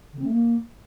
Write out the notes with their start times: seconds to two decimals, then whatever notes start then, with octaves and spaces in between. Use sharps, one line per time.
0.13 D3
0.18 C4
0.24 A3
0.30 A#3